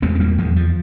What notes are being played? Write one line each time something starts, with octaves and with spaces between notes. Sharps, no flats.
E2 G#3 C4
C4
G3 A#3
E2 F3 G#3
F3